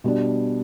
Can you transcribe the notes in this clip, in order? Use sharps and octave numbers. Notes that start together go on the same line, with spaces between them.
B2 G3 D4